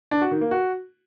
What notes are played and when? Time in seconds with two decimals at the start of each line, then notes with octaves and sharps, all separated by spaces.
0.11 D4
0.21 F#4
0.31 D#3
0.41 A#3
0.51 F#4